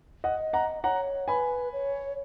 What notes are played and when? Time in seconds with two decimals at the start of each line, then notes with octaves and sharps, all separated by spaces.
0.24 D#5 F#5
0.39 D#5
0.53 F#5 A#5
0.83 C#5 F#5 A#5
1.28 B4 G#5 B5
1.73 C#5